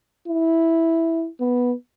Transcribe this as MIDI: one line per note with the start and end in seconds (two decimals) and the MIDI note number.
0.28 1.28 64
1.41 1.73 59